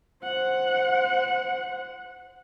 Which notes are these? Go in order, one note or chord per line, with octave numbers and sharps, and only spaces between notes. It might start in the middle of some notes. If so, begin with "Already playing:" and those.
C5 F#5